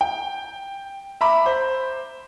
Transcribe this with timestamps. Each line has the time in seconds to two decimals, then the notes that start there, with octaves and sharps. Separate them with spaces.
0.01 G5
1.21 E5 A#5 B5 D6
1.46 C5